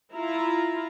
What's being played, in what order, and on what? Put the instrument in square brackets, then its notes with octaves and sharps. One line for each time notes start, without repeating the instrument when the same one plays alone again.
[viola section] E4 F4 A#5